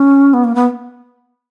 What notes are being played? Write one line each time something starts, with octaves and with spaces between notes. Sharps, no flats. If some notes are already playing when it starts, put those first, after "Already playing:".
Already playing: C#4
B3
A#3
B3